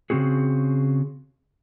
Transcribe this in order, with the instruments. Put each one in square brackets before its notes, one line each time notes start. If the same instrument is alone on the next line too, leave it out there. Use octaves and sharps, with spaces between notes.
[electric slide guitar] C#3 F#3 C4 F#4 G#4